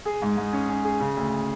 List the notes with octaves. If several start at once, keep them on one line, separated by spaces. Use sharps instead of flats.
G#4
G#2
G#2
C#4
C#4
G#4
C#3
D2